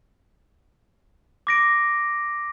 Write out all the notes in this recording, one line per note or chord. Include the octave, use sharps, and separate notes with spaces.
D6 A#6 D7